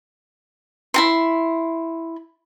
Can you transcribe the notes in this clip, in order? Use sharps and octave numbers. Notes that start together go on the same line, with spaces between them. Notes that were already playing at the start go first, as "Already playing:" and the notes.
E4 F#4 C6